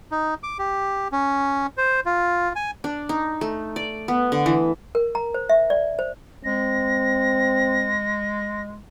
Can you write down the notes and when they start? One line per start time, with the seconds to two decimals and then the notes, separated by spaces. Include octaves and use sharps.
0.11 D#4
0.43 D6
0.59 G4
1.12 C#4
1.77 C5
2.06 F4
2.56 G#5
2.84 D4
3.09 D#4
3.41 A3
3.76 D5
4.08 B3
4.32 D3
4.46 E3
4.95 A#4
5.15 A#5
5.34 C5
5.49 E5
5.70 D5
5.99 C5
6.44 G#3 C4 A#6